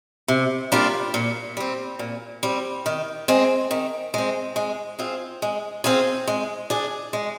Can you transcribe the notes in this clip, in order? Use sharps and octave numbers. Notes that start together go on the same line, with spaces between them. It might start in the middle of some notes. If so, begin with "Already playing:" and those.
C3
G3 A#3 D4 F4
A#2
G3 C4
A#2
G3 C4
D#3
G#3 C4
D#3
G#3 C4
G#3
C4 F4 G#4
G#3
C4 F4 G#4
G#3
D4 G#4
G#3